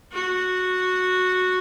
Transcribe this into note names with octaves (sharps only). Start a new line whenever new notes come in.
F#4